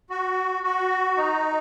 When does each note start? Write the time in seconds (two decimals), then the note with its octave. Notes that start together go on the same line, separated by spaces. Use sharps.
0.10 F#4
0.63 F#4
1.17 D#4